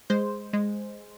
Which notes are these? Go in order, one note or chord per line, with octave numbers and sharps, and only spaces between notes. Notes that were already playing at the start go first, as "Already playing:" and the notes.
G#3 C5
G#3